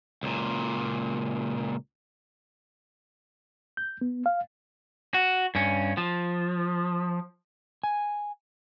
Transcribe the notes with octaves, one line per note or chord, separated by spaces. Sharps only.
C#2 A#2
G6
B3
F5
F#4
G2 C#4
F3
G#5